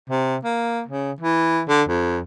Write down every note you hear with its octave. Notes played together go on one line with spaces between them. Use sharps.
C3
A#3
C#3
E3
D3
F2